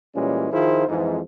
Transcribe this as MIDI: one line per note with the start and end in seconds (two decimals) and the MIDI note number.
0.14 0.47 46
0.14 0.47 52
0.14 0.47 55
0.14 0.47 56
0.14 0.47 61
0.53 0.86 51
0.53 0.86 53
0.53 0.86 64
0.53 0.86 65
0.53 0.86 68
0.53 0.86 72
0.88 1.19 41
0.88 1.19 44
0.88 1.19 52